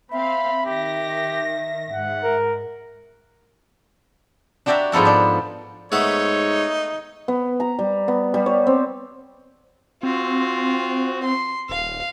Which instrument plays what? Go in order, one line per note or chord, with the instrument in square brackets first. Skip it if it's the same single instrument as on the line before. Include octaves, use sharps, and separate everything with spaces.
[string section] C4 F5 [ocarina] E5 [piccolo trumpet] B5
[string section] D#3 A#6 [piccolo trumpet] G4
[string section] G#2 [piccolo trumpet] F#5
[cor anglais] A#4
[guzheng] D4 F#4 G4 D5 E5 A#5
G#2 F3 B3 A4 A#5
D4 D5
[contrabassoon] G#2 [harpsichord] A3 B3 A4 [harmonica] D#4 [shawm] C#5
[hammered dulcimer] B3
A#5
G3
B3
G3
C#5
C4
[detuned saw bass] C4 [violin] F4 F#4
[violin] C6
[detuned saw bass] D#1 [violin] F5